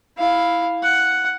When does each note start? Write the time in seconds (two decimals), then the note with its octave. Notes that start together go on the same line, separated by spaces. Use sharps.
0.18 E4 F5
0.83 F#5